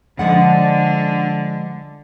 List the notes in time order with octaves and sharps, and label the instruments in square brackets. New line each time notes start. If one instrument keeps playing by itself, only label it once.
[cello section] D3 [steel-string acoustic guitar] F3 G#3 F#5